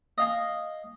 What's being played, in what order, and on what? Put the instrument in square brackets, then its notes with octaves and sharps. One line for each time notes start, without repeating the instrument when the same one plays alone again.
[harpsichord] D#5 F5 G#5